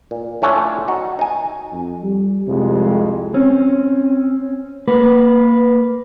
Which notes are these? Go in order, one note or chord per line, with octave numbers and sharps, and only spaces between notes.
A#2
A2 A3 C#4 D4 F4
D#4 F#4
D#4 G#5
F2
G3
C2 F2 C3 G#3
C4 C#4
A#3 B4